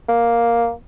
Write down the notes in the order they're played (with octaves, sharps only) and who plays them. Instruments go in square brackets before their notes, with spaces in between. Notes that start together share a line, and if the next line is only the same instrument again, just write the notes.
[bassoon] A#3